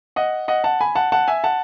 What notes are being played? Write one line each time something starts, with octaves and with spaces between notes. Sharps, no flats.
D#5 F#5
D#5 F#5
F#5 A5
G#5 B5
F#5 A5
F#5 A5
E5 G#5
F#5 A5